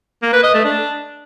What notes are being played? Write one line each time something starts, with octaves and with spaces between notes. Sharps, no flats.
A#3
B4
D#5
A3
D4